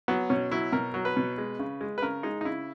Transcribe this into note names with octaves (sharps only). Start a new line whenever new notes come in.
F#3 B3
B2 C#4
F#3 E4
B2 A#4
F#3
B4
B2
G#3
C#3
G#3
B4
C#3 A#4
G#3 D#4
D#4
C#3 E4